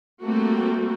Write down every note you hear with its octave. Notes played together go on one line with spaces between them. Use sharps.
G3 A3 A#3 C4 F#4